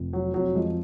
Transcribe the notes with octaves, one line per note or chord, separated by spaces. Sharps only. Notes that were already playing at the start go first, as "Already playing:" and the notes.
Already playing: F1 F2
F#3
F2 F#3
F3 G#3